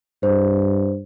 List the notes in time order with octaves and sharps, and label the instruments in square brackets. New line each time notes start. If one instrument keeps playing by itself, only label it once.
[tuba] G2 [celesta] C5